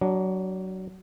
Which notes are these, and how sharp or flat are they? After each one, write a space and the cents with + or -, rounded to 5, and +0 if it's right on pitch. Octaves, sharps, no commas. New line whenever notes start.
F#3 +20 D4 +0